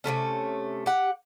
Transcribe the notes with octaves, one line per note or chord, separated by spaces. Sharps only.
C3 E3 A3 C#4
G4 F#5